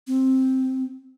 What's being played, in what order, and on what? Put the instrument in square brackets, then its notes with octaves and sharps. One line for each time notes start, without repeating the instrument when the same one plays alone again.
[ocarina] C4